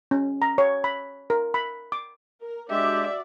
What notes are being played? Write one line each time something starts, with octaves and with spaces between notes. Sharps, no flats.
C#4
A#5
C#5
B5
A#4
B5
D6
A#4
G#3 D4 F#4 G4 D5 E5